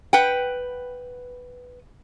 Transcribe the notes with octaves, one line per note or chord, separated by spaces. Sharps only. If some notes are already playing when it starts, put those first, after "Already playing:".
B4 F#5 G5